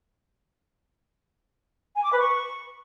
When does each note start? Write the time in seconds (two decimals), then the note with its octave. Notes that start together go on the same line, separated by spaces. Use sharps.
1.95 G#5
2.03 D6
2.11 B4
2.19 C#6